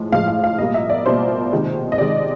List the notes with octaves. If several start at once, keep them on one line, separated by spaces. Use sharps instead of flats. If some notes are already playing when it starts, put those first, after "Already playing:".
Already playing: A2 F3 G#3
A2 F3 G#3 F5
F5
F5
B2 G3 A#3 D#5
E5
D5
B2 G3 A#3 C5
C3 D#3 G#3
D#5
C3 D#3 G#3 D5